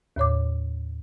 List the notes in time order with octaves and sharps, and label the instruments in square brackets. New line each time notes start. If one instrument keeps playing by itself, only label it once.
[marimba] D#2 A2 C#5 D6